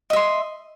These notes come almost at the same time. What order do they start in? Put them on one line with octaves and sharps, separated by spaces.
D#5 E5 C6